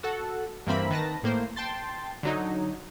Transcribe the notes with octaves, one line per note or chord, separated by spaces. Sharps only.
F#4 A4 F#5
G2 E3 A#3 C4 E5 B5
D#3 B4 A5 A#6
A2 A#3 C5
G5 A5 C6 A6
D3 F#3 D#4